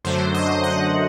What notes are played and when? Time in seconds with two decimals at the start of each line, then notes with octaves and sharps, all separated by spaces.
0.05 F#2 D3 F#3 A3 D4 C5
0.34 D#5
0.63 F#5